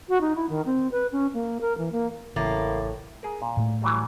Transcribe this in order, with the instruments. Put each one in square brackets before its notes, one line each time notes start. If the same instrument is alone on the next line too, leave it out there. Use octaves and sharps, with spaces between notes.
[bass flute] F#4
D#4
E4
D#3
C4
B4
C#4
A#3
A#4
E3
A#3
[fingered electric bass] A1 C#3 E3 [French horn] A2 [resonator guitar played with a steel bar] A#3 [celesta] E5 D6 A6
[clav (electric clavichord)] G#4 A#4
A#2
[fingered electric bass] A2 A3
[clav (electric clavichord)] E3 F#3 G3